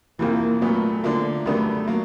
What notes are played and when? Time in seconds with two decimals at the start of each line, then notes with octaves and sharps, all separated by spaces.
0.19 F2 C3 E3 A#3
0.61 A#2 F#3 A3 B3
1.04 D3 F3 A#3
1.46 F#2 D#3 G3 A3 B3 D4
1.88 F#3 A#3